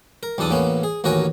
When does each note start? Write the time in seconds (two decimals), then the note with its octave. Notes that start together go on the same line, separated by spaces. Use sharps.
0.23 A#4
0.38 B1 E2 D4 A4 D#6
0.51 A1 A#3 B3 C#4
0.83 G#4
1.04 A1 D#2 F#4 A#4 C#5 G#5